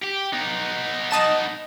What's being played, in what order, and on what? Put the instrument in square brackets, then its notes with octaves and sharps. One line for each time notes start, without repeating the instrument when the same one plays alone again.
[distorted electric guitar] G4
B3 D#4
[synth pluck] D#5 A5 E7